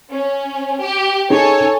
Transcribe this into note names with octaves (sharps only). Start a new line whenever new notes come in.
C#4
G4
C#4 D#4 G#4 A4 C#5 G#5